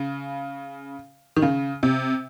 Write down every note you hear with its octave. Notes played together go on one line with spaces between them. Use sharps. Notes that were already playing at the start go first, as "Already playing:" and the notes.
Already playing: C#3
D#3
C#3
C3